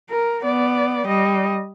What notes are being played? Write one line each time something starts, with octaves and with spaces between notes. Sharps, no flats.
A#4
B3 D5
G3 D#5